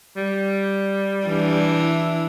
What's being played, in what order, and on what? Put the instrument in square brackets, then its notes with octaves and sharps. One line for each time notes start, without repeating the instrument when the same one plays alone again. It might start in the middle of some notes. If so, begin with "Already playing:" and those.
[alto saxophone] G3
[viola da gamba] E3 D4
[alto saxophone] E4